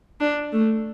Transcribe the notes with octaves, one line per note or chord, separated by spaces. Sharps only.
D4
A3